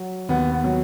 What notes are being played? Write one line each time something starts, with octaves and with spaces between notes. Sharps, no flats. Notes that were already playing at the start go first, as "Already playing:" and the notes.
Already playing: F#3
D#2 B3
B3
F#3